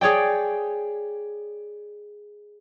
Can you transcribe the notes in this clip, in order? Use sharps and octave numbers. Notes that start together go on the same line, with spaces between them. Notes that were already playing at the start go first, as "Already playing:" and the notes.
G#4 C#5 D5 G5